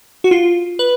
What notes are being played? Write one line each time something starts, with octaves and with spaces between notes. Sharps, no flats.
F#4
F4
B4